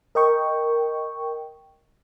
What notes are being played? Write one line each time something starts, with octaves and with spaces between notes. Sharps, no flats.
A#4 D#5 G5 C#6